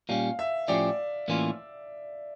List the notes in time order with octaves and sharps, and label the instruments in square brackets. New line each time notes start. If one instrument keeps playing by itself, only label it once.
[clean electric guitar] A#2 G3 C#4 [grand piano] F5
[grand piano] E5
[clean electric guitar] A2 F3 C#4 G4 [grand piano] D5
[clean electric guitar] A2 E3 A#3 C#4 F4